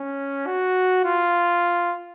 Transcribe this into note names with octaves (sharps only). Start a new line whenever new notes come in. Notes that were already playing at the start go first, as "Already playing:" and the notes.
Already playing: C#4
F#4
F4